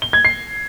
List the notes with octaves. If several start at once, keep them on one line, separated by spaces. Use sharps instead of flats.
G7
G#6
C7